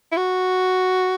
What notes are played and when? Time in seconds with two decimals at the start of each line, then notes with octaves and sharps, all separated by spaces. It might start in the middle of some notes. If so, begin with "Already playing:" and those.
0.12 E4
0.17 F#4